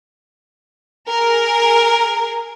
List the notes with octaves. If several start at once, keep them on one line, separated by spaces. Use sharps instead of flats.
G#4 A#4